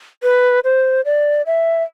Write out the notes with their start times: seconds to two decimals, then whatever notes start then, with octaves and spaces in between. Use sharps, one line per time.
0.23 B4
0.64 C5
1.05 D5
1.46 E5